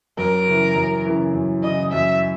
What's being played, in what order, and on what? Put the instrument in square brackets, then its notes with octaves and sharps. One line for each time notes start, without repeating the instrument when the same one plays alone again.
[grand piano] F#2 [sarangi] A#4
[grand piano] C#3 E3
F#2
C#3 E3
F#2
[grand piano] C#3 E3 [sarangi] D#5
[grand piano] F#2 [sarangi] E5